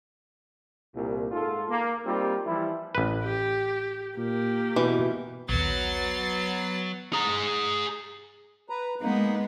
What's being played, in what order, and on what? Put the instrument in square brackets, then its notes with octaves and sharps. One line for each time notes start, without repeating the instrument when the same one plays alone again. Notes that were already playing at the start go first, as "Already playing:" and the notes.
[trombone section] C2 A#2
G#2 F4 A4
A#3
G3 A#3 C4 D#4 F4 G4
E3 F3 G3 E4
[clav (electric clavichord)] A1 B4
[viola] G4
[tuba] A#2 [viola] A#3 G4
[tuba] B2 [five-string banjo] E3
[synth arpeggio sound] A#1 D#2 [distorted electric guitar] F#3 [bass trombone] B3 [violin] A6 C7
[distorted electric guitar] G#4 A#5
[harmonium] B4 A#5
[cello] G#3 B3 [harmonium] A#3 D#4